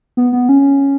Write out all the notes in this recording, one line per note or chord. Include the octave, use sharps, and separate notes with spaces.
B3
B3
C#4